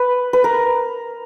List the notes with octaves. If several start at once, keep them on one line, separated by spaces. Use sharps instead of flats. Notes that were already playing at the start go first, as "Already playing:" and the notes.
Already playing: B4
B4
A#4